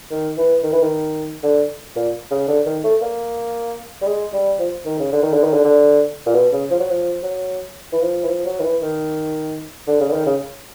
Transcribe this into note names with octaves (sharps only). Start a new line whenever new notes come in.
D#3
E3
D#3
E3
D#3
D3
A#2
C#3
D3
D#3
A3
A#3
G3
G#3
G3
F3
D#3
C#3
D3
D#3
D3
D#3
D3
D3
A#2
B2
C#3
F3
F#3
F3
F#3
E3
F3
E3
F3
F#3
D#3
E3
D#3
D3
C#3
D3
D#3
C#3